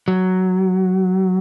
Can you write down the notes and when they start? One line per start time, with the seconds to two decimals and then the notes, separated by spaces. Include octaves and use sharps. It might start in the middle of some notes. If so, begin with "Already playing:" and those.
0.08 F#3